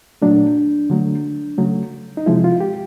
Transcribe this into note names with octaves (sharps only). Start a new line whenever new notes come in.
A#2 F#3 A3 D4
D3 F#3 A3
C#3 F#3 A3
D#4
C3 F3 G#3 E4
F4
G4